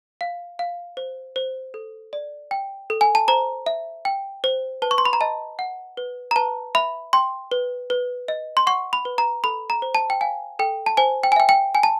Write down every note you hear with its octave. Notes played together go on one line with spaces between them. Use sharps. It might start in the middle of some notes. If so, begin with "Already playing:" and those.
F5
F5
C5
C5
A4
D5
G5
A4
G#5
A5
C5 A#5
E5
G5
C5
B4 A5
C#6
C6
B5
A#5
D#5 A5
F#5
B4
A#5
B4 A5
E5 B5
G5 C6
B4
B4
D#5
C6
F#5 C#6
B5
B4
A#5
A4 B5
A#5
C5
A5
G5
F5 G#5
A4 G5
A5
C5 G#5
G5
G#5
E5 G5
G5
G5 G#5
A5